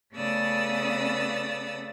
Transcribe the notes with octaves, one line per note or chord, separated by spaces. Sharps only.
C#3 A3 B3 D5 D#6 E6